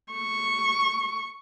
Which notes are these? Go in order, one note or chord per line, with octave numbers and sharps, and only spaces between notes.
C#6